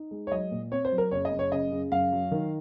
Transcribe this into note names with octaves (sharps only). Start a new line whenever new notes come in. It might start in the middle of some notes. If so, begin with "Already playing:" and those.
Already playing: D#4
G#3
C#5
F#3 D#5
A#2
C4 C#5
C5
F#3
A#4
F#1 C#5
D#5
F#2
C#5
C#3 D#5
C#3
F#2 F5
F#3
D#3